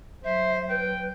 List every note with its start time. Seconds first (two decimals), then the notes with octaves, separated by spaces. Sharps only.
0.24 F#3 C5 E5
0.69 B4 G5